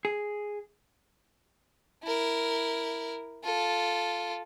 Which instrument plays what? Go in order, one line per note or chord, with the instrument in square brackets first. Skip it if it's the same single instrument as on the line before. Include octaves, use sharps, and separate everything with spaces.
[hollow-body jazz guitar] G#4
[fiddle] E4 A#4
F4 A4